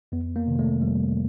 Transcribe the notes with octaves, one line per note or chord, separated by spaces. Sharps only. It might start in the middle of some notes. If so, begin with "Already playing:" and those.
F2 B3
A#3
C3 D#3
A3
F2 G3